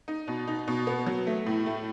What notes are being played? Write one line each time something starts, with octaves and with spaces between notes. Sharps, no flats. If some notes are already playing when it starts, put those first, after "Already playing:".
D#4
B2
D#4
B2
B3
F#3
A3
A2
A3